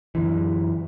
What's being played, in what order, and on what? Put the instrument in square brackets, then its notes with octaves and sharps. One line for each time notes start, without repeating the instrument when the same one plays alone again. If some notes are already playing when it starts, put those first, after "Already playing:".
[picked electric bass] F#2 D3 E3